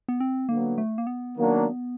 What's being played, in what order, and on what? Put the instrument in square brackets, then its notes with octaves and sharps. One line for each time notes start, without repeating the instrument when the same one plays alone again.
[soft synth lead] B3
C4
[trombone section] D3 F#3 B3 [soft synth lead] A#3
[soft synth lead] A3
A#3
B3
[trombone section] D#3 F#3 A#3 D4